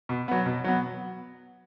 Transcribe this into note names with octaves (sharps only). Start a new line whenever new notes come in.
B2
F#3 B3
B2
F#3 B3